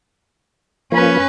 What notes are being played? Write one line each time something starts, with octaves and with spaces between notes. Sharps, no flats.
F3 A#3 C#4 B4